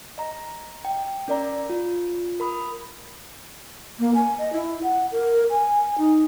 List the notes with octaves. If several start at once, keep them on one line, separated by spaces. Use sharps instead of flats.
D#5 A#5
G5
C#4 A#4 D5 A#5
F4
A#4 B5 D#6
A#3
G#5
D#5
E4
F#5
A#4
G#5
D#4